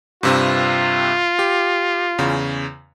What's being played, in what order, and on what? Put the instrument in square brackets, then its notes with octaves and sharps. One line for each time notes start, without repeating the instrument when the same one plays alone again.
[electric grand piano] G2 C3 C4 [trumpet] F4
[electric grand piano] G4
E2 C#3